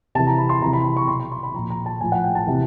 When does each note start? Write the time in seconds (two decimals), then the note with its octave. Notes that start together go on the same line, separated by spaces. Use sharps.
0.15 C3 E3 A5
0.27 A#5
0.38 B5
0.49 C6
0.61 C3 E3 A#5
0.73 B5
0.84 B5
0.97 C#6
1.08 B2 C6
1.20 C6
1.32 C6
1.43 B5
1.54 A#2 F3 A#5
1.70 A#5
1.86 A5
2.01 A2 F3 G#5
2.12 F#5
2.24 G5
2.35 A5
2.47 C3 E3